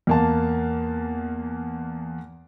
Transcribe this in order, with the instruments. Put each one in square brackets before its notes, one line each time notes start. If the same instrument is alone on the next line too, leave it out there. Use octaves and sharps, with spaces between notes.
[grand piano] E2 A#3 A5